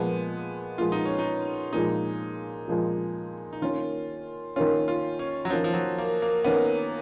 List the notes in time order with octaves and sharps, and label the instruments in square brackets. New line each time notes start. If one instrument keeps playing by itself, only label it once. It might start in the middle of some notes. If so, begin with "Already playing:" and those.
Already playing: [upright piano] A#2 F3 G#3 [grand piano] B3
[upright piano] A#2 F3 G#3 [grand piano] F4
[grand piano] D#4
C#4
D#4
[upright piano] A#2 F3 G#3 [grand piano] D#4
[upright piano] A#2 F3 G#3
[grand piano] D#4
[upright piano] D#3 A#3 C#4 [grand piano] F4
[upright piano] D#3 A#3 C#4 [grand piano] F4
[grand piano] F4
C#4
F#3
[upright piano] D#3 A#3 C#4 [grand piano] F3
[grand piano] F3
F#3
A#3
A#3
[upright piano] D#3 A#3 C#4 [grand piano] B3